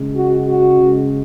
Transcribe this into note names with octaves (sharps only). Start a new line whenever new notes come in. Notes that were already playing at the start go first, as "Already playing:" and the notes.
Already playing: C#3 G#3
F#4
F#4
C#3 G#3